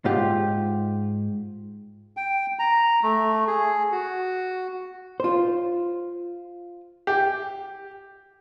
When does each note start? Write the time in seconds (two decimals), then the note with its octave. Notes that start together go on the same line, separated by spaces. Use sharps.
0.05 G#2 G#3 F4 G4
2.17 G5
2.59 A#5
3.03 A3
3.47 G#4
3.92 F#4
5.20 F4 C5
7.07 G4